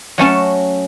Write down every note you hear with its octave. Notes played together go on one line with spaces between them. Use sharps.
F#3 A3 C#4 A5